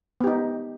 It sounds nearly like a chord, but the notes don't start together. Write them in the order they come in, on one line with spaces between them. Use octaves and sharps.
B3 G4 D#4